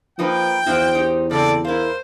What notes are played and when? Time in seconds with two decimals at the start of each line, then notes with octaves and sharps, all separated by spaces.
0.19 F3 A#3 D#4 B4 G5
0.66 E2 F3 E4 F#4 C5
0.95 D#4 G4
1.31 C#3 C4 A4 D5
1.65 E4 A#4 C5 F5